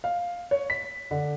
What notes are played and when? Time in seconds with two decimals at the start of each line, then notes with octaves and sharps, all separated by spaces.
0.04 F5
0.51 C#5
0.70 B6
1.11 D3